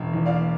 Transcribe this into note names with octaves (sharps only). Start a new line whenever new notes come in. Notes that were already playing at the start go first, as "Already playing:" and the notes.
Already playing: E1
E2
D5 F5